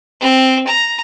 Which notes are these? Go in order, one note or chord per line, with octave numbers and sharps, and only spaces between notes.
C4
A#5